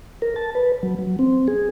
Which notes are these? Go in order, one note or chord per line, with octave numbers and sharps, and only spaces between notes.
A#4
A5
B4
F#3
F#3
C4
G#4